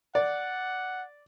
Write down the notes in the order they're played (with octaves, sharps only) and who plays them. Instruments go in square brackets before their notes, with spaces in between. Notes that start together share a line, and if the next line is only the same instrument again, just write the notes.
[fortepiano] D5 [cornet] F#5